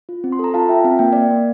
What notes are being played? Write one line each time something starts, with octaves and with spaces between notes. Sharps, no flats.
F4
C4
C6
A4 A#5
F4 F5 A5
F4 E5 G5
C4 F5
A#3 G5
A#3 D5 F5
A#3